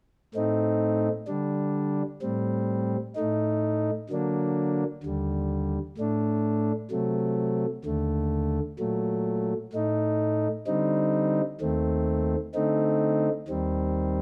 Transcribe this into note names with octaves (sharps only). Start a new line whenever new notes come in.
A2 A3 C4 D#4
D3 G3 D4
A2 G3 C4
A2 A3 D#4
D3 F#3 A#3 D4
D#2 D3 G3
A2 A3 D4
C3 F#3 A3
D#2 D3 A3
A#2 F#3 A3
A2 A3 D#4
D3 G3 C4 D#4
D#2 D#3 A3 C4
D3 A3 C4 D#4
D#2 D#3 G3 C4